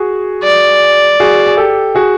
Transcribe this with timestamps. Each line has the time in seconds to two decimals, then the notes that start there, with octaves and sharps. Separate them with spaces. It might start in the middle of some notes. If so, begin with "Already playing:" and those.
Already playing: F#4 G#4
0.44 D5
1.20 F#4 G#4
1.47 G#4
1.57 G4 A4
1.95 F#4 G#4